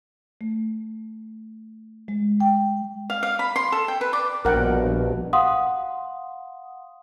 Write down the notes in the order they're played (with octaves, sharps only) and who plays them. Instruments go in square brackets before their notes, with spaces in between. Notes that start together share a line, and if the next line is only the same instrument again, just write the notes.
[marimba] A3
G#3
G5
[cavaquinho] F5
F5
B5
C6
A4
G5
B4
D5
[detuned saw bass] A#1 [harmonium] G2 B2 [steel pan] A#4 F#5 G5
[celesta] F5 F#5 C6 D#6